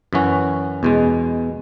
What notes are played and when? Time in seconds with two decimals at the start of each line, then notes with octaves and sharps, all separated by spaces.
0.13 F#2 E3 C#4 F#4
0.83 E2 B2 G#3